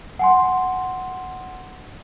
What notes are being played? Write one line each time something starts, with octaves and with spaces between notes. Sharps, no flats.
F#5 G#5 C6